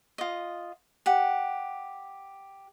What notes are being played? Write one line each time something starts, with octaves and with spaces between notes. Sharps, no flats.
F4 D#5
G4 F#5